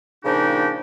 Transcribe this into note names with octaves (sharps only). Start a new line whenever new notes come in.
A#2 C#3 F3 D4 D#4 G4